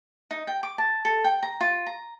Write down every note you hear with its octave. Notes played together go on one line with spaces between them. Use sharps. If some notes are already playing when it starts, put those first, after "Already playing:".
D#4
G5
D6
A5
A4
G5
A#5
F4
A#5